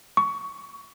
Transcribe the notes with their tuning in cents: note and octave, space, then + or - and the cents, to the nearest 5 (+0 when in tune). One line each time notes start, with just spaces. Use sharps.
C#6 +20